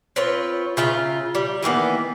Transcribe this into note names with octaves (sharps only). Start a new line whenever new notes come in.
C4 F4 B4 C#5
C#3 F4 E5 A#5
G3
D#3 E3 A#3 B3